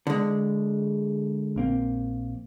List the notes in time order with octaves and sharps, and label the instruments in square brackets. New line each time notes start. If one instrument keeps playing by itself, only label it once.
[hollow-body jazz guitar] D3 G#3
[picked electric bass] A#1 A#3 C4